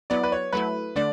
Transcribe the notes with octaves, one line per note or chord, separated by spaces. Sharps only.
F#3 B3 E4 D5
B4
C#5
F#3 A3 E4 B4
D3 A3 D4 D5